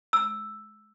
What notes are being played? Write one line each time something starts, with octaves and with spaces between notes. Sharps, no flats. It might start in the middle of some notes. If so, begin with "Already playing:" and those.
E6